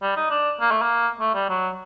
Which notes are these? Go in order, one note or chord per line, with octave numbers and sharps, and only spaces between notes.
G3
D#4
D4
A#3
A3
A#3
A3
G3
F#3